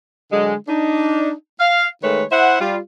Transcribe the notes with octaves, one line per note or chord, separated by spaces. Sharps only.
D3 F#3 G#3
D4 D#4
F5
D#3 G#3 A3 B4 C#5
E4 C5 E5 F#5
G3 F4